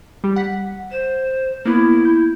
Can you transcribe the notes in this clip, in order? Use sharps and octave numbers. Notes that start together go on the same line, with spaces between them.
G3 G4
F#5 B6
C5 E7
A#3 B3 E4
G6